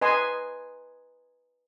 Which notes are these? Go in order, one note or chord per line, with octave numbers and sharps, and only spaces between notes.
B4 D#5 G#5 C6